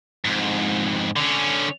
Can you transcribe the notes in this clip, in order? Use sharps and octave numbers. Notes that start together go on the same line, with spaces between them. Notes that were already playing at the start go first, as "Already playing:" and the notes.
F2 G#2
D3 C#4